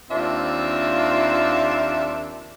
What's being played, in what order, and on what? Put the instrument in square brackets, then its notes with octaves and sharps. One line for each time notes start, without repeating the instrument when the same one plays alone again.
[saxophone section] D#2 A#3 C4 D4 F4 E5